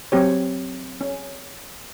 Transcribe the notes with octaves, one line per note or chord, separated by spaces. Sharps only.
F#3 C4 G4 C#5
C#4